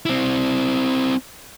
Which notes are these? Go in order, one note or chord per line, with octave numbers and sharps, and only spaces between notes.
C4 E4